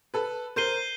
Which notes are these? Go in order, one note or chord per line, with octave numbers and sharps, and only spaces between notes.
A4 B4
A#4 C5 G6 C7 D#7 G7